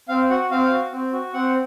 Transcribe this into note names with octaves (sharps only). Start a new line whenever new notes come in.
C4 F5
F#4 F#5
C4 F5
F#4
C4
F#4
C4 F#5